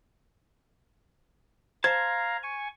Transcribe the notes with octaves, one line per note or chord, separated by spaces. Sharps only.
C5 F5 A5 A#5 G#6
G#5 C#6